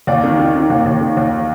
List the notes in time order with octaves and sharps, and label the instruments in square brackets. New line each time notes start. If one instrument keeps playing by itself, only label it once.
[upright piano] D#2 D5
D#3
D#3
D#3
D#2
D#2
D#3
D#2